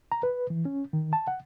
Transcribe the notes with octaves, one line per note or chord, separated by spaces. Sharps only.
A#5
B4
E3
C#4
D#3
A5
F#5